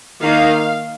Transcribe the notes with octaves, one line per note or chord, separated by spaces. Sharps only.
D#3 A#3 D#4 F5